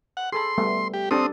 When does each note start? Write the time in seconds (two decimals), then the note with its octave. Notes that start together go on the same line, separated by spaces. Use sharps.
0.17 F#5
0.32 G#4 A4 B5 C6
0.58 G3 A3 B3
0.94 G4
1.11 C4 D4 G4 A4 D#6